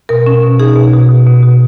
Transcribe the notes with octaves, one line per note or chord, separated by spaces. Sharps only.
B2 A#4
C#4
B2
D#4 G#4
B2
B2
B2
B2
B2